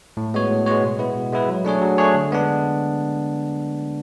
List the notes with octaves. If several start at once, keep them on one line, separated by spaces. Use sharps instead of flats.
A2
G#3 B3 F#4 C#5
A2
G#3 B3 F#4 C#5
B2
G#3 B3 E4 B4
B2
G#3 B3 E4 B4
F#3
A3 D4 G#4 C#5
F#3
A3 D4 G#4 C#5
D3
G#3 B3 D4